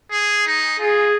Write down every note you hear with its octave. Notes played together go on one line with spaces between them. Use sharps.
G#4
D#4
F4 G#4